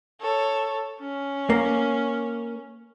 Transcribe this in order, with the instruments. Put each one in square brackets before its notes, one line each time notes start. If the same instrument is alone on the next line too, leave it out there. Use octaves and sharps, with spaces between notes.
[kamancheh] A4 C#5
C#4
[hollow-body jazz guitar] A#3